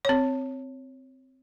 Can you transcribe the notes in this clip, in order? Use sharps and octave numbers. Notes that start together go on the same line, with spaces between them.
C4 C#5